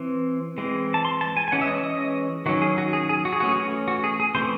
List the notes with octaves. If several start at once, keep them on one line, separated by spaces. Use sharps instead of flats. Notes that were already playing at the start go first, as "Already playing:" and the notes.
Already playing: E3 C4
E3 G#3 C4
A5
C6
A5
G#5
G#5
E3 G#3 C#4 F#5
E5
D#5
D#5
D#3 F#3 C#4 F#4
G#4
F#4
G#4
G#4
F#4
G#4
E3 A3 C#4 F#4
G#4
F#4
F#4
G#4
G#4
E3 A3 C4 C5